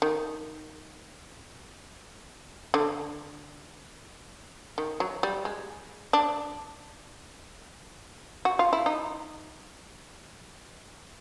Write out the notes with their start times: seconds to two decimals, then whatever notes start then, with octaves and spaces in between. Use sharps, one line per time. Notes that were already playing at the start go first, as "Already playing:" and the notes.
0.02 D#3
2.74 D3
4.78 D#3
5.00 F#3
5.23 G3
5.45 G#3
6.13 D4
8.45 F#4
8.59 F4
8.73 E4
8.86 D#4